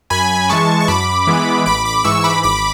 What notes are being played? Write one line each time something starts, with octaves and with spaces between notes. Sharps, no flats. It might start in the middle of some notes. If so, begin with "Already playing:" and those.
F#2 G#5 B5
E3 G#3 A5 C#6
C#6
F#2 B5 D6
E3 G#3 B3
A1 B5 D6
B5 D6
G#2 E3 C#6 E6
B5 D6
G#1 B5 D6